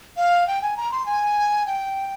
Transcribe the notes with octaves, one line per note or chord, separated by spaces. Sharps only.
F5
G5
G#5
A#5
C6
G#5
G5